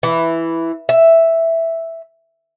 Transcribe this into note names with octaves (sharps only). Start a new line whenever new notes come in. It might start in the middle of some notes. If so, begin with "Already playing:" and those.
E3
E5